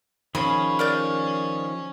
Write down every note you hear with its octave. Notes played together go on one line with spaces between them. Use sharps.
D#3 F3 C#4 G#4 B5
A#4 D5 G6